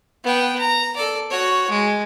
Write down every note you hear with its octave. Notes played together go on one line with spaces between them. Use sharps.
B3 G5
A#5
A4 D5
F#4 C#5
G#3